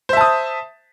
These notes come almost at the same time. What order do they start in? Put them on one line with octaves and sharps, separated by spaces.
C5 E5 A5 D#6